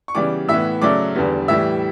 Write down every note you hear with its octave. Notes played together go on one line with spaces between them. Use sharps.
C#6
C#3 E3 G3 B3 D5 D6
A2 E3 B3 E5 E6
C#3 F#3 A3 D5 D6
E2 D3 G3 B3
A2 E3 G3 E5 E6